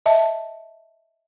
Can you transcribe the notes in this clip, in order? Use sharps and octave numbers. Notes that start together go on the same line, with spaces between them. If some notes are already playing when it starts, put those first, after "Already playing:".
D#5 E5 A5